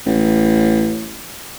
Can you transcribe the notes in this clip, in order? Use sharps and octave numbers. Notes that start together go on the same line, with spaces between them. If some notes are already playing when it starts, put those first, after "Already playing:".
A1